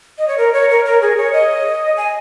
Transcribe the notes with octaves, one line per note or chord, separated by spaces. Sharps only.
D#5
C#5
A#4
C#5
A#4
A#4
G#4
C#5
D#5
G#5